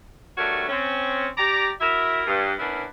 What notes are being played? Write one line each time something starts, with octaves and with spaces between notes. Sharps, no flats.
G2 G3 A3 F#4 A#4 C#5
C4 C#4
G4 D5 A#5
E4 F#4 A#4 E5
G2
B3 C#4 D4 E4 A#4 B4